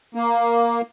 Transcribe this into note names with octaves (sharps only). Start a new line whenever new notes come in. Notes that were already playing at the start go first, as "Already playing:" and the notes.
A#3